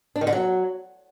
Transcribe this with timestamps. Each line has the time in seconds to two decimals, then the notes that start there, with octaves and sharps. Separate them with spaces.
0.16 D4
0.21 D#3
0.27 D3
0.33 F#3